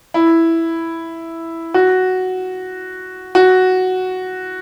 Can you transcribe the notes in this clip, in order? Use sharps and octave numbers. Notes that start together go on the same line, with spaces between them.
E4
F#4
F#4